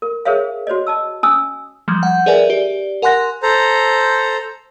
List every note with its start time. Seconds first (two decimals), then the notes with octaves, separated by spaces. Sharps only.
0.02 A#4
0.25 G#4 A#4 C5 C#5 E5 F5
0.67 F#4 C5 C#5 D#5
0.87 D#5 A5 E6
1.23 C#4 G#5 D#6 E6
1.88 F3 G3 G#3
2.03 F#5 G6
2.26 G#4 A#4 B4 D5 E5 G#5
2.50 G4 D5
3.02 A#4 F#5 G#5 C6 F#6 A#6
3.43 A4 C5 A#5